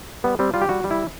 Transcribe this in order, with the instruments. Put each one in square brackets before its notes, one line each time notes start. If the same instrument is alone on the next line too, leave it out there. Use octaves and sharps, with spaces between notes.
[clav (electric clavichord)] G3 B3
G3 C4
G3 F4
G4
G3 F#4
G3
E4